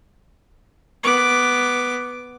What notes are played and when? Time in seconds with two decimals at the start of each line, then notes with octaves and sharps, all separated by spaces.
1.03 B3 D6